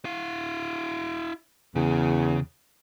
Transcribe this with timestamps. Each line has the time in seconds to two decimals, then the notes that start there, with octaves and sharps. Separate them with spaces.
0.05 E4 F5
1.76 E2 C#3